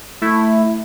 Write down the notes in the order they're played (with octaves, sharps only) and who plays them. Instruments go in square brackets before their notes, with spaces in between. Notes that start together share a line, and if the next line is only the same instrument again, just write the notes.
[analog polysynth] A3 E4